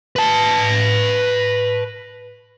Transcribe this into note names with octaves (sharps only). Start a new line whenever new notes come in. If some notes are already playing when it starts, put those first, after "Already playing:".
B4 A5